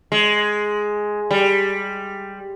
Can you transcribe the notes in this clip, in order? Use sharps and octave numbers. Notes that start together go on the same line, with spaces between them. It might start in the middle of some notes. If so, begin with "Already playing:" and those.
G#3
G3